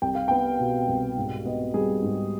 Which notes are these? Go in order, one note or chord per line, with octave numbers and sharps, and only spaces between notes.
C2 G5
F5
B3 G5
B2
C2
G#2
B3 D#5
G3 G#4
G#2